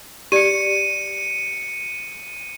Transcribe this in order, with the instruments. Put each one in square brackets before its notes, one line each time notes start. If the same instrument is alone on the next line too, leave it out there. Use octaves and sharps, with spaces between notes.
[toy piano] G4 D5 [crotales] C#7 D#7